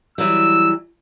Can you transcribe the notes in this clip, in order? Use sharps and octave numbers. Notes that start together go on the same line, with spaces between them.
E3 F#3 G3 E6